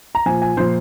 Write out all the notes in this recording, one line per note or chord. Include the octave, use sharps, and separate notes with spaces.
A#5
A#2 F3 G#5
G#5
A#2 F3 C5